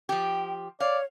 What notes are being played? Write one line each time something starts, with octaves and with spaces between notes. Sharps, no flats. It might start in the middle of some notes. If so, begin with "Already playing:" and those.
F3 G4 G5
C#5 D5 F5